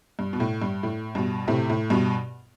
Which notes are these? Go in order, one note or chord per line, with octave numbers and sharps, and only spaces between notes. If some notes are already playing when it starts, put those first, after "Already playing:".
G2
B2
A2
G2
A2
G2 B2
A2 C3
A2
G2 B2